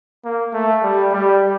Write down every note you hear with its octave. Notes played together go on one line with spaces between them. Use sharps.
A#3
A3
G3
G3